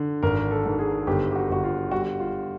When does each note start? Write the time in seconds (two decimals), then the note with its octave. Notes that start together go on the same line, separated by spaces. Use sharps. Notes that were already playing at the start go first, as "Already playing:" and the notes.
Already playing: D3
0.23 G#1 A#4
0.51 A4
0.65 G#2
0.79 G#4
1.07 G1 G4
1.31 G4
1.36 F#4
1.50 G1 F#4
1.64 F4
1.91 G3 F#4
2.20 F4